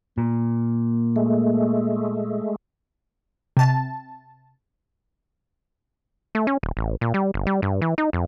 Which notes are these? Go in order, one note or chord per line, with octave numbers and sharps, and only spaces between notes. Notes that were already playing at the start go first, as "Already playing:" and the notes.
A#2 A#3
G#3 A3
C3 A5
A3
C#4
D#1
A1
A#2
G3
G1
G3
G2
E3
D#4
F2